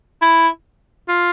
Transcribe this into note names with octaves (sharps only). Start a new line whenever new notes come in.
E4
F4